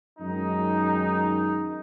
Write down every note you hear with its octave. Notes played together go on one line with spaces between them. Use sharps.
F#2 D#3 G#3 D#4